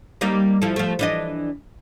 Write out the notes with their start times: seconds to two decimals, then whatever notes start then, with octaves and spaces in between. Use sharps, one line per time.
0.21 G3 A#3 D#4
0.62 F3 E4 A4
0.76 F3 A3
0.99 E3 D4 D#5